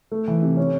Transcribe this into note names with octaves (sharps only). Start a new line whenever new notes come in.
A3
E3
C3
C#4